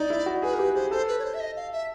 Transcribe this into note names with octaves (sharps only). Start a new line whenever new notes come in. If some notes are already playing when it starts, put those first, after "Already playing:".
Already playing: D#4 D5
E4
F#4
G#4 B4
A#4
G4 B4
G#4 C5
A4 C5
B4
C#5
C5
E5
D#5
F5
E5